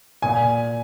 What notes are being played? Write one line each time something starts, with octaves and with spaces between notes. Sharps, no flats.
A#2 G#5